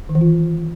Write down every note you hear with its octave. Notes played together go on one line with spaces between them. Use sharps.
D#3
E3
F4